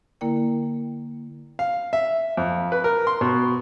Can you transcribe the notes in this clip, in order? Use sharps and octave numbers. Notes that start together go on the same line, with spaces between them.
D3 A#3 E4 A#4 D5 G5
F5
E5
F2
B4
A#4
C6
B2